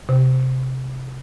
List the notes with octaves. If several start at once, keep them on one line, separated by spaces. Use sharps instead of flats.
C3